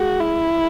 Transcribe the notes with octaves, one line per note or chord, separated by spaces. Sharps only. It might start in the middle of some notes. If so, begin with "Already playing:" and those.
Already playing: G#3 F#4
E4